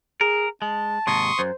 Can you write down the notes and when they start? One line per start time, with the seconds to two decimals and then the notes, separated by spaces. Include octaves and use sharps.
0.21 G#4 A#4
0.62 G#3 A5
1.07 D#2 G#2 C3 C6 C#6 D#6
1.39 F#2 C5